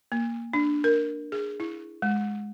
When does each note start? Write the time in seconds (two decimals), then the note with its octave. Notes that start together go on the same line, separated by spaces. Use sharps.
0.12 A#3
0.53 D4
0.84 A#4
1.32 G#4
1.60 E4
2.02 G#3